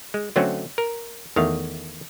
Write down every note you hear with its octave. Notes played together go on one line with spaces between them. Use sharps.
G#3
D3 F#3 A3 C4 C#4 F#4
A#4
E2 D#3 A3 F5